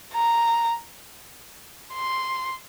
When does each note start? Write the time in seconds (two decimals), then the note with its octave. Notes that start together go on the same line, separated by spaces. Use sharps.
0.13 A#5
1.94 C6